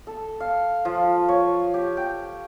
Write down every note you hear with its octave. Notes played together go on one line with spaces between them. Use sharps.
A4
F5
F3
C#5
G4
G5